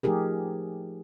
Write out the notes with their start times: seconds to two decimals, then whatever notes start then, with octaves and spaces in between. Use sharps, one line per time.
0.03 F3 A3 D#4 G4 G#4 A#4